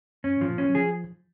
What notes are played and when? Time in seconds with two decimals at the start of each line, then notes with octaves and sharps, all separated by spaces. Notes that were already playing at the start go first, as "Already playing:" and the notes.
0.24 F#2 C#4
0.38 G#2 F3
0.50 A#2
0.58 C#4
0.69 F#3
0.75 F3 G#4